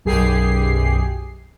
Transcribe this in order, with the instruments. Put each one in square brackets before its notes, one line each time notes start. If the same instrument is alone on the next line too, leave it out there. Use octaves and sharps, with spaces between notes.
[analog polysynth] B1 F#2 G4 G#4 C7